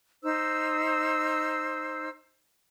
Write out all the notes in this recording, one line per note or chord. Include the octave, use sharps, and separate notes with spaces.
D#4 C5 E6